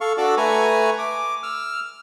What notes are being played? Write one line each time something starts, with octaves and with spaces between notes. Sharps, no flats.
A4 F5 C#6
D4 F#4 A4 D5 D6 E6
A3 B4 G#5 A#5 C#6
D6
E6 F6